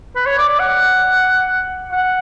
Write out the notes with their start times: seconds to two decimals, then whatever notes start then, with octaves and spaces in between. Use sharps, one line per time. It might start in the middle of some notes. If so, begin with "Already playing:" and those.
0.15 B4
0.26 C#5
0.38 D5
0.49 D5
0.59 F#5
1.92 F#5